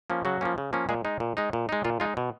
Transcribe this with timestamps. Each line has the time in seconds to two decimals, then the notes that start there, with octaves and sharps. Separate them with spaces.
0.10 F3 A#3 C#4
0.25 C#3 F#3 F#4
0.41 F3 A#3 C#4
0.58 C#3
0.73 F3 A#3 C#4
0.89 A#2 G#3 G#4
1.05 G#3 D#4
1.20 A#2
1.37 G#3 D#4
1.53 A#2
1.69 G#3 D#4
1.85 A#2 F4
2.00 G#3 D#4 F4
2.17 B2